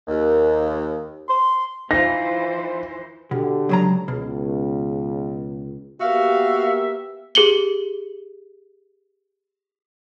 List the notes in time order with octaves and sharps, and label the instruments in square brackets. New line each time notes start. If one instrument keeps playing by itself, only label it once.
[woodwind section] D#2
C6
[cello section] E3 C5 [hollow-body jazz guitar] D#4 F4 [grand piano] A#6
[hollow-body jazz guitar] B2 [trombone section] D3 G4
[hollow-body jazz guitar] C#2 F#3 A#5
[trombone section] C#2 [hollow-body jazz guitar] B2
[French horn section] A#3 B3 G4 [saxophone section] F#4 F5 [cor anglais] E5
[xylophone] G4 G#4 C#7 F#7 G7